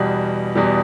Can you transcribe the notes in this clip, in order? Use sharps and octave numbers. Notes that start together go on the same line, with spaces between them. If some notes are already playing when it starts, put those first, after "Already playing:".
Already playing: E2 B2 G3
E2 B2 G3